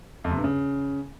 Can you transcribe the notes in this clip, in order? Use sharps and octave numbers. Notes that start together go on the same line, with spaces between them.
F2
C3
G2
C#3